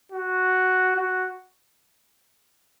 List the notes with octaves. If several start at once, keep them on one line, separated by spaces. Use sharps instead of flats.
F#4
F#4